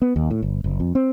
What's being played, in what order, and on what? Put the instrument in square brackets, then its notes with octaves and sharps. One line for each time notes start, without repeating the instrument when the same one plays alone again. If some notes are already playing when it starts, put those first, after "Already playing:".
[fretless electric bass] B3
D#2
A2
G1
F#1
F2
C4